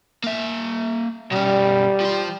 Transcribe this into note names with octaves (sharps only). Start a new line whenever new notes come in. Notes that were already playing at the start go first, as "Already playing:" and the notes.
A#3 E5
B2 G3 C#4
F3 C6